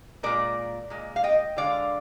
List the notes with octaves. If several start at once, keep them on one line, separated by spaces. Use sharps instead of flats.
A#2 G#3 A#4 D5
A#2 G#3
F5
D#5 G5
D3 G#3 D5 F5